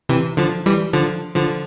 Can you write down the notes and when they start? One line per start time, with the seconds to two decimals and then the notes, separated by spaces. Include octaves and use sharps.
0.09 C3 E3
0.37 D3 F3
0.66 E3 G3
0.93 D3 F3
1.35 D3 F3